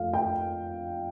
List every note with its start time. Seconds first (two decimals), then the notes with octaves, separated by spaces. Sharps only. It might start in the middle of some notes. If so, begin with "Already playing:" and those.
Already playing: F2 F3 A3 F5
0.13 G5